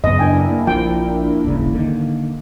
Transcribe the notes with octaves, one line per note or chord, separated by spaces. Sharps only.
F#2 C#3 F#3 B3 D#5
D4 E4 A#4 G5 G#5
A#3
A#1 F3 G5
D#1 G#1 C#3
D3 D#3